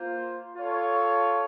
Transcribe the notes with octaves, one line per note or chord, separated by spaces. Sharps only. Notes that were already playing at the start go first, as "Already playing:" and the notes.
Already playing: A#3 F4 C5
F4 A4 C#5